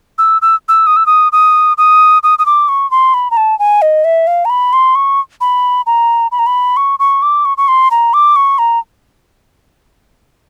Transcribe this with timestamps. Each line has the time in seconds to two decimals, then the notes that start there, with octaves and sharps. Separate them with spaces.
0.18 E6
0.42 E6
0.69 E6
0.87 D#6
0.97 E6
1.06 D#6
1.32 D#6
1.78 D#6
2.23 D#6
2.39 D#6
2.46 D6
2.69 C#6
2.91 C6
3.14 B5
3.31 A#5
3.37 A5
3.59 G#5
3.82 D#5
4.05 E5
4.27 F5
4.45 A#5
4.50 B5
4.73 C6
4.95 C#6
5.41 B5
5.86 A#5
6.32 B5
6.39 A#5
6.46 B5
6.77 C#6
6.99 C#6
7.22 D6
7.45 C#6
7.58 C#6
7.68 C6
7.91 A#5
8.14 D6
8.36 C#6
8.59 A#5